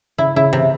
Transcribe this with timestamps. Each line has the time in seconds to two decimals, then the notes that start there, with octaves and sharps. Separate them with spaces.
0.18 C#3 E4
0.36 C#3 E4
0.53 C3 E3